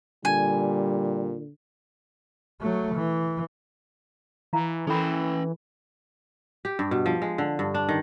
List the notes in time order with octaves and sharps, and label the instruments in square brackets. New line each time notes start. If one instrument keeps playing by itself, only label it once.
[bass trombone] A#2 [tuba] D3 [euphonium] G3 [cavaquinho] G#5
[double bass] F#3 A3
E3
[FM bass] E3 [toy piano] E4 F5 A#5
[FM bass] E3 [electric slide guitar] C#4 G5 [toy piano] A4 A#4 B5
[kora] G4
G2
B2
F3
G#3
D3
G2
D4
D#3